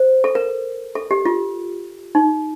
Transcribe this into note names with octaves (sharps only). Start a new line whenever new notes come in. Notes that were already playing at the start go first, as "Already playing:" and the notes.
Already playing: C5
A4
A#4
A4
G4
F4
D#4